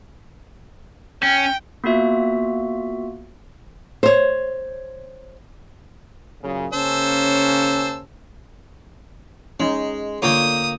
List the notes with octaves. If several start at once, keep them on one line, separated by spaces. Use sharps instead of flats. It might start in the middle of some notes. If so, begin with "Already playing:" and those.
C#4 G5
A#3 B3 F4 F#4 E5
C5 C#5
F#2 A#2 C#3
C#3 A#3 C#4 C5 A5 E6
G#3 C#4 D#4
D3 A#3 F4 C#5 G5 D#6